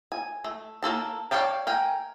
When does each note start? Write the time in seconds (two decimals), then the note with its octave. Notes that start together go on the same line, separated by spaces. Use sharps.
0.12 G#5
0.44 A3
0.83 A#3 F#4 A4 A5
1.31 C#5 D5 F5 G5 A5
1.67 A#4 G5 G#5